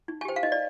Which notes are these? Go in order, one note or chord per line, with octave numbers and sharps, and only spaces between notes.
D#4
G#5
G4 C5 G5
F5
D#4 D#5
D5